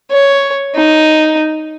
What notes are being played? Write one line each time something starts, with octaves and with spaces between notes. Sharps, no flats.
C#5
D#4